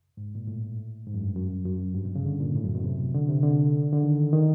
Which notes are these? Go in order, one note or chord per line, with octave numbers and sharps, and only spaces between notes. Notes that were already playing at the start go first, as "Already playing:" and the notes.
G#2
A#2
A2
G#2
F#2
G2
F#2
F#2
G2
B2
C#3
D3
A#2
A2
F#2
B2
C3
D3
C3
D3
D3
D#3
D#3